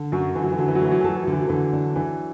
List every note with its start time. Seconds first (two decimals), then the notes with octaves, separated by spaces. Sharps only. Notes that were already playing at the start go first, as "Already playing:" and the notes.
Already playing: D3
0.12 F#2 F#3 F#4
0.35 D3 E3
0.44 F#3
0.52 E3
0.58 D3 F#3
0.68 E3
0.75 F#3
0.81 E3 A3
0.91 F#3
1.01 E3
1.04 F#3 A4
1.17 E3
1.24 F#3
1.27 D3
1.32 E3
1.40 F#3
1.49 D3 E3
1.73 D4
1.95 E3 D4